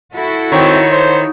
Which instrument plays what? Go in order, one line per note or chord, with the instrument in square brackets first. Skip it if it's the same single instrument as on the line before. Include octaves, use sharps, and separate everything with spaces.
[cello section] E4 F#4 A4
[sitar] D#3 [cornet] C4 [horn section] C#5
[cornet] C5